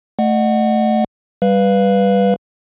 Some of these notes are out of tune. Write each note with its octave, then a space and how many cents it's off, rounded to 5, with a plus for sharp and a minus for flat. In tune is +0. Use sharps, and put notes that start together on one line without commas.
A3 +0 D#5 -45 F#5 +0
G3 +0 B4 +0 F5 +0